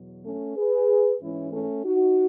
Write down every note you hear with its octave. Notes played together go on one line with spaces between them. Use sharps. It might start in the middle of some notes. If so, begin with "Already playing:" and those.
Already playing: E2 B2 F#3
A3 C#4
G#4 B4
G#2 E3 G#3 C#4 E4
A3 C#4
D#4 F#4